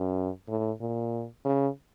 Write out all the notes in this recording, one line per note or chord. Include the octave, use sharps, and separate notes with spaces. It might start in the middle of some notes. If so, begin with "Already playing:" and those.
Already playing: F#2
A2
A#2
C#3